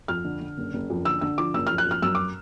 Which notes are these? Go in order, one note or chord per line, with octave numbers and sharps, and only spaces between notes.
F2 F6
D3
D3
F#1
F#1
F2
D3 E6
D3 E6
F3 D6
F#1 E6
F3 F6
F#6
F2 F6
F#2 E6
D6